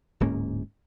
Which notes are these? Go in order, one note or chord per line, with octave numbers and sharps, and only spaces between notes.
D1 G#2 A#3 C#4